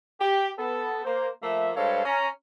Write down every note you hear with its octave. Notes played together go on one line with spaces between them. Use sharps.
G4
B3 A4
A#3 C5
F3 A3 A#3 E5
G2 G#3 A4 C5 C#5 F5
C#4 A#5